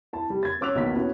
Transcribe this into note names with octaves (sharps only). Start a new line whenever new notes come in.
E4 A5
G3
G#6 A6
C#4 C#5 D6 E6 F#6 F7
B1 E2 D#3 A#3 B6
B3 C#4 E4 F#4